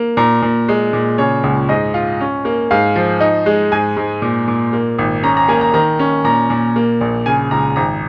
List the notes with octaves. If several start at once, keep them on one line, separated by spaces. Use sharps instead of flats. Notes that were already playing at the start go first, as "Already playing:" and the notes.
Already playing: A#3
A#2 A#5
A#2
G#3
A#2
C#3 C#5
C#2
G#2 D#5
F4
C#4
A#3
G#2 F5
F3
D#4
G#3
G#2 G#5
G#2
A#2
A#2
A#3
G#1
C#4 A#5
A#5
A#3 G#5
A#5
D#3 A#5
C#4
A#2 A#5
A#2
A#3
A#1
C#3 G#5
C#2 A#5
G#1 A#5